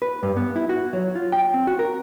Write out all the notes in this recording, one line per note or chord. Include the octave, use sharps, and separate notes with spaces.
B4
G2
B3
E4
F#4
F#3
F4
G5
C4
F#4
A#4